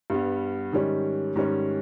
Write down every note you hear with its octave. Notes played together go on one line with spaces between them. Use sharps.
G2 G3 B3
G#2 D#3 G3 C#4
G#2 D#3 G3 C#4